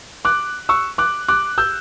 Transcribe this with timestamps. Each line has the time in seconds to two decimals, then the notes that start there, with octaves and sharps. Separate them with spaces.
0.25 D6 F#6
0.69 C#6 E6
0.98 D6 F#6
1.28 D6 F#6
1.58 E6 G6